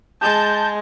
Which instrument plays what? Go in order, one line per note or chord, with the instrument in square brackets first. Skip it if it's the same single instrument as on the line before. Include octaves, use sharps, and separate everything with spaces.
[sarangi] G#3 [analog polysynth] A5 G6